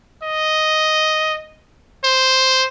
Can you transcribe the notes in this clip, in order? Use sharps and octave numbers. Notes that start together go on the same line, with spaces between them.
D#5
C5